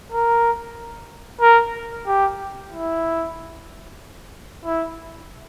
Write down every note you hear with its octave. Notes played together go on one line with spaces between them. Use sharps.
A#4
A#4
G4
E4
E4